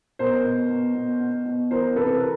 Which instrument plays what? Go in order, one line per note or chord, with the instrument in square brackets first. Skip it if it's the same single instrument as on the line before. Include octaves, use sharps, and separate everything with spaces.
[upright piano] B2 A#4 C5
B2
B2
B2
B2
B2
E3 A#4 C5
C3 A4 B4
A#4